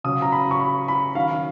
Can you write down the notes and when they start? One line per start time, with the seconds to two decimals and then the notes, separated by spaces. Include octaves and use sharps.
0.04 C#3 F#3 C#4 D#6
0.22 A#5
0.32 B5
0.51 C#6
0.60 B5
0.88 B5
1.15 D#3 F#3 C#4 F5